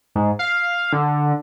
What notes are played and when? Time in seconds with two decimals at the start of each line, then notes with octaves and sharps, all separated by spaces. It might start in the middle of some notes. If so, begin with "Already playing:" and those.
0.15 G#2
0.39 F5
0.93 D3